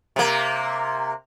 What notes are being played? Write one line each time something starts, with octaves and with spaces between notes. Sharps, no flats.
C3 A#3